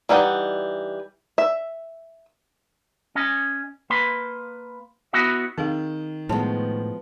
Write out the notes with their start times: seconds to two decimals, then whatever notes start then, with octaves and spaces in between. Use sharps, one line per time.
0.09 E3 G3 D#4 F#5
1.38 E5
3.15 C#4 D#5
3.90 A#3 B4 C6
5.13 B3 E4 F#4 D#5 E5
5.58 D#3 C4 G#4 F5
6.29 A2 F3 G#3 B3 C#5 A5